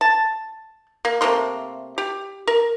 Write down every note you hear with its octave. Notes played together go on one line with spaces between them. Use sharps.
A5
A#3
C3 A3 A#3 C6
G4
A#4